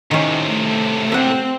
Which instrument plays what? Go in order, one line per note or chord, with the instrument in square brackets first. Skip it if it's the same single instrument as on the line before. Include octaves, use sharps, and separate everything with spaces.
[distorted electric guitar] A2 C3 [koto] D#3 C#4
[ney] A3
[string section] C4 [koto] E5 F#5